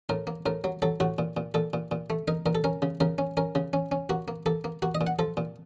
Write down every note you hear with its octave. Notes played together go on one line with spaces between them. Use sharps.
A2 A#4
A#3
A2 A#4
F#3
F#3 A4
A2 F#4
A#2
A#2
A#2 A4
A#2
A#2
A3
D#4 A#4
A#2 A#4
A4
C#4 A#4
C#3
C#3 A#4
C#4
C#4 A#4
C#3
C#4
C#4
A#3 F#4
A#3
A#3 A4
A#3
A#3 F#4
D#5
A#2
F#5
F3 A4
A#2